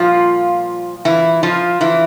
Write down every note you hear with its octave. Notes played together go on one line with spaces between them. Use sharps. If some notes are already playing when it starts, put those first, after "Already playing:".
Already playing: A#2 F3 G3 A#3 F4
E3 E4
F3 F4
E3 E4